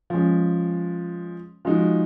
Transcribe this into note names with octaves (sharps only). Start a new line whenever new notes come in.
F3 G#3 C#4
F3 G#3 D#4 F#4